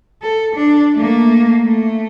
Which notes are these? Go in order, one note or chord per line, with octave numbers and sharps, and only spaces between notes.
A4
D4
A3 A#3
A3